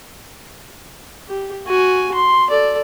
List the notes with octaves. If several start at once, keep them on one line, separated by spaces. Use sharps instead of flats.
G4
F#4 G#5
C6
A4 D5